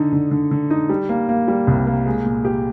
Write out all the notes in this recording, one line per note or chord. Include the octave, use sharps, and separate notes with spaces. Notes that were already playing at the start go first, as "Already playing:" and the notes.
Already playing: D3 D#4
D3
D3
D3
D#4
G3
A#3
A#3
G3
C2
A#3
G#3
A#2
G4